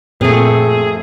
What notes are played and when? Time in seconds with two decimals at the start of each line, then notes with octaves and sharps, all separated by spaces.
0.21 F#2 A#2 F3 A3 C4 G#4